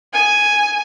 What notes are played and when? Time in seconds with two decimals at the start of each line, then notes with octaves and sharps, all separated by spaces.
0.13 G#5